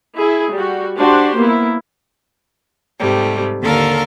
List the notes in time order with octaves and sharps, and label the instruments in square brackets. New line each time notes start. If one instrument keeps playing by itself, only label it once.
[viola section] E4 G#4
G3 F#4
D4 F#4 G4 C5 C6
A#3 B3 E4
[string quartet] G#2 C3 G3 A3
D#2 D3 A4 A#4 F5